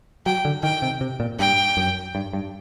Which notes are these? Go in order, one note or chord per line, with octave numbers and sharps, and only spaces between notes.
F#3 G5
D3
D#3 G5
C3
C3
A#2
G2 G5
F#2
G2
G2